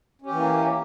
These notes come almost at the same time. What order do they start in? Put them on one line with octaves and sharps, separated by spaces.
C#4 G4 E3 A#3